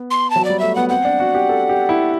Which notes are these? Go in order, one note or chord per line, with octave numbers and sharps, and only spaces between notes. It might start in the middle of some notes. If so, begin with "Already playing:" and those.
Already playing: B3
C6
A5
F#3
G3 D5
A3 E5
B3 F#5
C4 F#5
D4
F#4
G4
A4
G4
E4